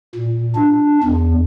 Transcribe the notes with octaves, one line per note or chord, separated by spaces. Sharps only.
A#2
D4
E2